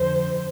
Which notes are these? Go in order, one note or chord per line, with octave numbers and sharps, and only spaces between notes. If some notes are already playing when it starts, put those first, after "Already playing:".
Already playing: F2 D3 C5